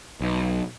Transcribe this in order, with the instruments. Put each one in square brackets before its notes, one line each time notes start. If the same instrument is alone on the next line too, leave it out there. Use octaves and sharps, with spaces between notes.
[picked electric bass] B1